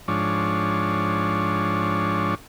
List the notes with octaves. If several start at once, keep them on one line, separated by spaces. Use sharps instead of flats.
G#2 F3 D4 C#5